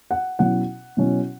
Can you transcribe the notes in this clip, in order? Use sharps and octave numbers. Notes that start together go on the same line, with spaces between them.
F#5
B2 F#3 C#4 E4 F#5
B2 F#3 C#4 E4